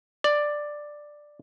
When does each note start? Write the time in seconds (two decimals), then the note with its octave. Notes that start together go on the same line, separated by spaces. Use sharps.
0.24 D5